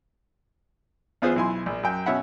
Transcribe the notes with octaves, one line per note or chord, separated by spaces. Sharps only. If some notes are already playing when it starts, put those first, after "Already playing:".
E2 B3 F4 G#4 C5
B1 E4 G#5 C6
A#1
F#2 G5
B2 C#4 E5 F#5 B5